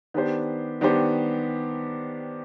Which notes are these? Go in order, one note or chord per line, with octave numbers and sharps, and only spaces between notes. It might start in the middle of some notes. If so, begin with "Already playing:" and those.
D#3 B3 D4 G4 C5
D#3 B3 D4 G4 C5